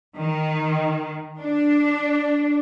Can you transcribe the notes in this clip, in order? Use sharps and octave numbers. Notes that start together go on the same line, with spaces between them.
D#3
D4